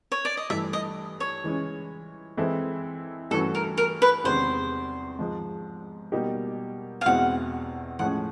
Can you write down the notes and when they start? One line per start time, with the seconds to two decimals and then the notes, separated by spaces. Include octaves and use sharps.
0.12 C#5
0.25 D5
0.37 D#5
0.50 G2 E3 A3 E5
0.73 D#5
1.20 C#5
1.44 E3 G#3 C#4
2.37 E3 G#3 C4 E4 A4
3.31 G2 E3 A3 C#4 F#4 A4
3.55 A#4
3.78 A#4
4.02 B4
4.24 E2 C3 D#3 G#3 C#4 C5
5.19 G#2 F3 G#3
6.12 B2 G3 A#3 D#4 G4
7.01 F5
7.06 E2 B2 G#3 C4 E4 F#5
7.99 A2 F3 G#3 C#4 F#5